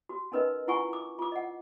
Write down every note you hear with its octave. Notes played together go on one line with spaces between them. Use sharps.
F#4
C#4 D#4 A#4 B4 D#5
E4 F4 F#5 G#5 C#6
D6
F4 D6
D#5 F#5